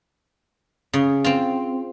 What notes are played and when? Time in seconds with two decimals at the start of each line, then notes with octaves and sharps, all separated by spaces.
0.93 C#3
1.24 C4 F4